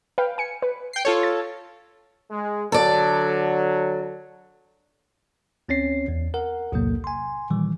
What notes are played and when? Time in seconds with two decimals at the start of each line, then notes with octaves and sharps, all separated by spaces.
0.18 B4 F5 G5
0.38 G#5 C#7
0.62 B4
0.93 G5 C7
1.05 F4 A4 C#5
1.23 A6
2.31 G#3
2.72 D3 F#3 A4 D5
5.69 D2 C4 C#4 C#5 C7
6.08 E2
6.34 A#4 F#5
6.72 B1 E2 A2 C3 F#3 A#3
7.04 G#5 C6
7.50 A#2 D#3 E3 G3